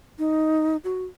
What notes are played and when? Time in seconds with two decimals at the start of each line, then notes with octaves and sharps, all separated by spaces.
0.19 D#4
0.84 F#4